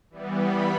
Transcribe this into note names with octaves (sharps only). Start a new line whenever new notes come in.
E3 G3 B3
B5